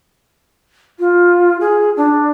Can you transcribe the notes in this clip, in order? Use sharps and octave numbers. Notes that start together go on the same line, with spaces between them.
F4
G#4
D4